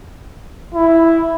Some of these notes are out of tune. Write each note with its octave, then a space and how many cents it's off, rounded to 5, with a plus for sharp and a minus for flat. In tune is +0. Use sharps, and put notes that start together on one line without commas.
E4 +0